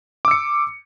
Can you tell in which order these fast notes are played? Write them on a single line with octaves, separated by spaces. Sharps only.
D6 E6 C#7